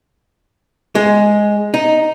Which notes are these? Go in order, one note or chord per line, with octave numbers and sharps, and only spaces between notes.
G#3
D#4